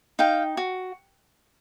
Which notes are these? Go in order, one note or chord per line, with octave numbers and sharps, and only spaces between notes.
D#4 F5 G5
F#4